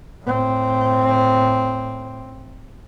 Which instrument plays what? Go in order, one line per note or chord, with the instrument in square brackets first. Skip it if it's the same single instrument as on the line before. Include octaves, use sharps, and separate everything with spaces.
[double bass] A2 C4